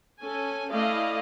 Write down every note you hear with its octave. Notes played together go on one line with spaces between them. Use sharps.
C#4 A4 G#5
A3 E4 D5 D#5 F5